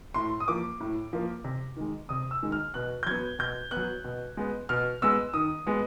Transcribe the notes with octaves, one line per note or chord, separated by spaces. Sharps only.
A2 C6
D#6
F3 A#3 D6
A2
F3 A#3
C3
D#3 G#3
C3 D#6
E6
D#3 G#3
F6
B2 F#6
G6
F#3 B3 G#6
B2 G6
B3 F#6
F#3
B2
G#3 B3
B2 F6
G#3 B3 E6
D#3 D#6
G#3 B3